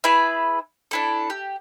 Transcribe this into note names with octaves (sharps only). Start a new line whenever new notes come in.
E4 G#4 B4 E5
D4 E4 A4
G4